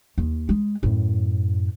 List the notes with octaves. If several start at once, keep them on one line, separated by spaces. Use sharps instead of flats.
D#2
G#3
F#2 A2